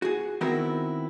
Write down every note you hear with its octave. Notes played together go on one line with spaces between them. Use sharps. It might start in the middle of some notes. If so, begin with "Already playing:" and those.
F#4 G#4
D#3 B3 C4 E4 F#4 A#4